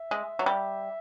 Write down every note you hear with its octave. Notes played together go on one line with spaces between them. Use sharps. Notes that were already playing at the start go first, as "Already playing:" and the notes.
Already playing: E5
G#3
F#3
G3